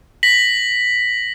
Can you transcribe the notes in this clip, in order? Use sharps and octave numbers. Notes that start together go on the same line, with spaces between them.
A#6 B6 F#7